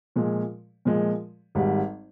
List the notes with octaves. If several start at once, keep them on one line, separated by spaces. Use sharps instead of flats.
A#2 F3 G#3
A#2 F3 G#3
G#1 G#2 G3